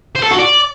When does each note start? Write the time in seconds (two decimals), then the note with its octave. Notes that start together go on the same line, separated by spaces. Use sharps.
0.16 C5
0.23 A4
0.31 F#4
0.39 D5